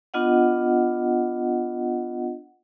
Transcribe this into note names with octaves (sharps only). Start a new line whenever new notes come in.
B3 D4 F4 D#5 F#5